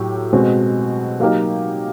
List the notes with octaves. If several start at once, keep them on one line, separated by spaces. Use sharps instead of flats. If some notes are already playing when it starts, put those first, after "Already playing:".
Already playing: A2 F#3 A3 G4
B2 G#3 C4
F#3 A#3 D#4 G4 A#4